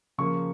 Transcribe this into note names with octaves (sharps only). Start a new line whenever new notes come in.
C#3 F3 A#3 C#6